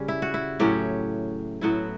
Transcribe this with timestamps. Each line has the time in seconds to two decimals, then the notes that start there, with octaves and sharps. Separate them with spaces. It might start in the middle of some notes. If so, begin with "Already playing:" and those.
Already playing: C#3 G3 C#4
0.08 E4
0.22 F#4
0.34 E4
0.60 A2 F#3 C#4 G4
1.61 A2 F#3 B3 E4 F#4